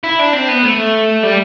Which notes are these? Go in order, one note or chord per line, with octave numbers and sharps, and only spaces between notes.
E4
D4
C4
B3
A3
G3